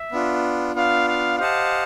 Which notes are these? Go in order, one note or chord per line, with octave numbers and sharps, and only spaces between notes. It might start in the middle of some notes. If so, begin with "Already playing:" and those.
Already playing: E5
B3 D4 F4
B3 D4 F4 F5
F5
G4 C5 D#5 F5 F#5 A5